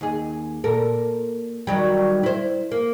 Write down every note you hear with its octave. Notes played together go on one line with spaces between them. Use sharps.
D#2 G#4
A#2 A4 A#4
D#3 F#3 G3
E4 C5
A#3